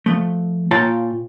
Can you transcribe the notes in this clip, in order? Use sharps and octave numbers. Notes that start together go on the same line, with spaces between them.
F3 A3
A#2 F4 C#5 G5 A5 A#5